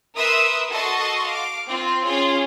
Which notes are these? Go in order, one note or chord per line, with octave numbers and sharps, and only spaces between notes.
A#4 B4 E5 C6 D#6 E6
F#4 A4 D#5 C6 C#6
F5 D6
C4 F4
C#4 F4 G#4 C#5